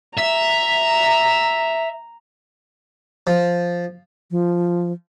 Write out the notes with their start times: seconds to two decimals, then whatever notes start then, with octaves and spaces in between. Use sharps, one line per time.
0.18 E5 A#5
3.27 F3
4.31 F3